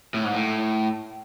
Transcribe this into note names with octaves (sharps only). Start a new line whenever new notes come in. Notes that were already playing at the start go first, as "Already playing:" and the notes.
A2
G#2
A2